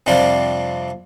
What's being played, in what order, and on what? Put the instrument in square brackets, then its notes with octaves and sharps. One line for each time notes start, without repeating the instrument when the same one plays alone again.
[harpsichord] F2 C3 G3 D4 F4